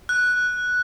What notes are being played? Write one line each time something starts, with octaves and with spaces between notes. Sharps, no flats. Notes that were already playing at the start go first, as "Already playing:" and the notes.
F#6